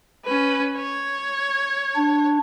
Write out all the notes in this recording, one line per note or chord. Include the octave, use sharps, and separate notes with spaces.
C#4 B4
C#5
D4